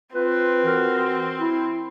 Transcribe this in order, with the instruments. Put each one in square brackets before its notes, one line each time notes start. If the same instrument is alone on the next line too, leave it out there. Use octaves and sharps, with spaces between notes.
[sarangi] C4 [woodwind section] F4 B4
[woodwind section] E3 F#4 A#4
E4